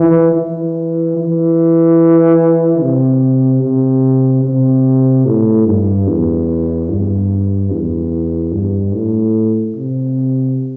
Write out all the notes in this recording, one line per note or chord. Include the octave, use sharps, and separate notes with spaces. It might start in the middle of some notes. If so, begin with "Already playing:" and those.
Already playing: E3
E3
E3
C3
C3
C3
A2
G2
E2
G2
E2
G2
A2
C3